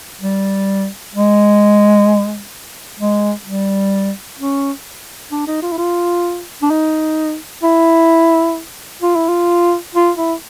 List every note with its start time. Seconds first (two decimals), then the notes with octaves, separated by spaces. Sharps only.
0.22 G3
1.14 G#3
3.00 G#3
3.46 G3
4.39 C#4
5.32 D4
5.47 D#4
5.62 F4
5.72 E4
5.78 F4
6.62 D4
6.70 D#4
7.63 E4
9.02 F4
9.15 E4
9.29 F4
9.95 F4
10.18 E4